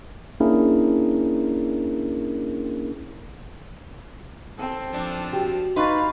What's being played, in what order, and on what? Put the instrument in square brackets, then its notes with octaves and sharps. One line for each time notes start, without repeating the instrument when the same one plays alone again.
[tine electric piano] A#3 C#4 D4 E4 G#4 A#4
[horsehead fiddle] C4 A4
[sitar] F3 D4
[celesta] F#4 G4 G5
[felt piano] D#4 [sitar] B4 [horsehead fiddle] F5 [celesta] C6 C#6 A6